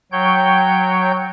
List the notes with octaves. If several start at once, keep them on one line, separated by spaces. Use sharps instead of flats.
F#3 C#5 G5 G6